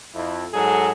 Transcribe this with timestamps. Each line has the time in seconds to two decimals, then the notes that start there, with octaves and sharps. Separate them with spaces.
0.14 F2 E4
0.53 G#2 F#3 G#4 A4